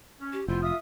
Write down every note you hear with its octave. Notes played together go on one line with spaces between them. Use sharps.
C#4
G4
F1 B3 E4 F4 C5
E5 F5 D#6